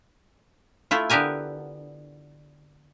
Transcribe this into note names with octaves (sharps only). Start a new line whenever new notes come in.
A3 E4 F4
D3 B3 G4 A#4 G#5